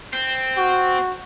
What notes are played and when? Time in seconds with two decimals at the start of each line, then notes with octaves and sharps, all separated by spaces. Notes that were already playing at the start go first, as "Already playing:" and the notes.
0.13 C4
0.57 F#4